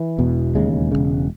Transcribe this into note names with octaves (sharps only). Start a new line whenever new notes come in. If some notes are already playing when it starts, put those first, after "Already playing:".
Already playing: E3
E1 E2 B2
E1 D#2 C#3 G#3
G#3
E1 D#2 C#3